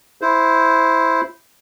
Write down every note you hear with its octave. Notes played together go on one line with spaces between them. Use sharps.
E4 C5